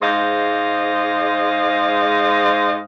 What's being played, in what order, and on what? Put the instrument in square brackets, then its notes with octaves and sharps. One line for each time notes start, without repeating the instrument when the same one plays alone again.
[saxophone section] G#2 G#3 C5 D#5 F5